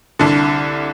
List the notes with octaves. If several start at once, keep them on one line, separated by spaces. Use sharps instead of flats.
C2 D3